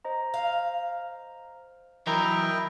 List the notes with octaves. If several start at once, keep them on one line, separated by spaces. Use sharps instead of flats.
C5 D#5 A#5
F5
E3 F#3 E4 A#4 D#5 G5 A#5 B5